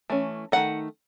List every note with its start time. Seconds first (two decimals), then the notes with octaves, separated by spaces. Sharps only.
0.10 E3 A3 C#4
0.52 D#3 A3 D#4 F#5